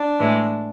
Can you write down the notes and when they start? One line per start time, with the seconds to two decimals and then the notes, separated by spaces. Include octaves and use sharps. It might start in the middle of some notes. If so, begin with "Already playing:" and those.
Already playing: D4
0.19 A2 E3 G#3